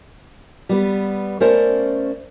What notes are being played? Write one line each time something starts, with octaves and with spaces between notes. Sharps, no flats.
G3 B3 B4
A3 C#4 A#4 C5 D5